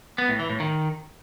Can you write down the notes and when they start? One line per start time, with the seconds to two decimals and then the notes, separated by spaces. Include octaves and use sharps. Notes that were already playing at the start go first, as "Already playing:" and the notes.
0.18 B3
0.29 A2
0.39 E3
0.50 A2
0.60 D#3